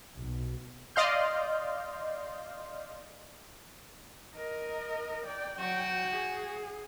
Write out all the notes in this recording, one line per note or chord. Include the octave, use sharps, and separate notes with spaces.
B1
D5 D#5 F5 C6 F6 G6
A#4 D#5
D5 G5
F#3 F#4 G5
G#4